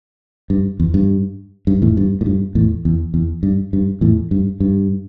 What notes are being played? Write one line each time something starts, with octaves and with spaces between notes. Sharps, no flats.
G2
E2
G2
G2
E2 A2
G2
A2
G2
E2 A2
E2
E2
G2
G2
E2 A2
G2
G2